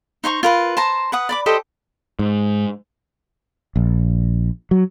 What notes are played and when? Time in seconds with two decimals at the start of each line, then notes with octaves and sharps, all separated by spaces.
0.24 D#4 C5 A#5 C#6
0.43 F4 A#4 B4
0.77 C5 A5 A#5
1.12 B4 F#5 D#6
1.29 D5 B5 D6
1.46 G4 A4 C5 D#5
2.19 G#2
3.76 A#1
4.71 F#3